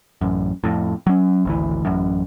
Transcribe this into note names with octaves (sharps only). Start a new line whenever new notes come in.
A1 F#2
F2 A2
F#3 C#4
G#1 D2 E3
A1 F#2